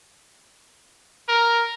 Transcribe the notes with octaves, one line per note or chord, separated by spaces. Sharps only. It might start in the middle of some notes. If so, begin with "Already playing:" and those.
A#4